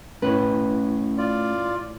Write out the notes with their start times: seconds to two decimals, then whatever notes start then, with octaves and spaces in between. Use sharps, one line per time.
0.22 A2 A3 C#4 B4 D#5
1.18 F4 D5